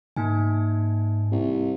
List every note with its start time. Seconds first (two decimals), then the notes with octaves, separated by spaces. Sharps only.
0.16 G#2 A#3 D#4 G#5
1.32 C2